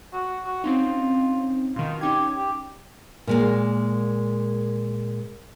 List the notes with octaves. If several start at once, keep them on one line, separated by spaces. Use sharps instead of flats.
F#4
F#4
C4 C#4 D#4 F4
B2 D#3 F4
C#4 D#4 G4 G#6
G4
A#2 G#3 A#3